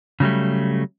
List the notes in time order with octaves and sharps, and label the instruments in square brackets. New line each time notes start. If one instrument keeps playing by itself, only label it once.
[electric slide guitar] C#3 F#3 G3 A3